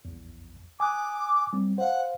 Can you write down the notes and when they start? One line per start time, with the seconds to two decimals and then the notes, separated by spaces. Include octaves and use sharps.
0.05 A#1 E2
0.80 G#5 D6 D#6 F#6
1.53 G3 C4
1.78 C5 F5 F#5